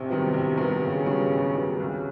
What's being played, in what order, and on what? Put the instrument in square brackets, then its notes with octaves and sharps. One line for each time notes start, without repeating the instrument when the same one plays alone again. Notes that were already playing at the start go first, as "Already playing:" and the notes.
Already playing: [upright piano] A1 [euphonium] C3
[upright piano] G2 D#3 F#3 B3
A1
G2 D#3 F#3 B3
[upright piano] A1 [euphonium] C#3
[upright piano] G2 D#3 F#3 B3
A1
G2 D#3 F#3 B3
[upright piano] C2 [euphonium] C#3